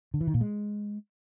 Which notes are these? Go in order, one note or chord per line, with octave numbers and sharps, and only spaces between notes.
D3
E3
D#3
A#2
G#3